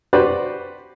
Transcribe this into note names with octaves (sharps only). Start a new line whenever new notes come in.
F#4 G4 B4 C5 D5